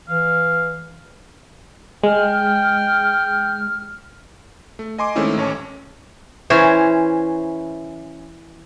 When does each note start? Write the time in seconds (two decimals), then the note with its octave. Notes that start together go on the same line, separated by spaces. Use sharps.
0.08 E3 F5
2.03 G#3 G5 F6
4.79 A3
4.98 D#5 G#5 C6 D6
5.16 D#3 G#3 A3 C4 C#4 E4
5.37 A1 C#4 C#5 A5
6.50 E3 C#4 C5